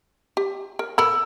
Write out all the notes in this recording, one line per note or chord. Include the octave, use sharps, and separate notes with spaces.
G4
A#4
A4 A#4 B5 E6